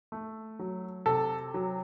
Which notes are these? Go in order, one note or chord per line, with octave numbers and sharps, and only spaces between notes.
A3
F#3
C3 A4
F#3